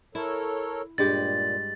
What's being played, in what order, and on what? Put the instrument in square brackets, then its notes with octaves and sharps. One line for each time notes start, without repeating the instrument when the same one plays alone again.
[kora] E4 [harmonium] A4 A#4 C#5
[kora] G2 G#3 G4 [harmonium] A#2 [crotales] A6